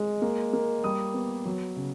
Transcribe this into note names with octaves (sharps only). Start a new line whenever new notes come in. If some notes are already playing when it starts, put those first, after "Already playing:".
Already playing: G#3
A#3
A#3
G3 D#6
B3
F#3
C#3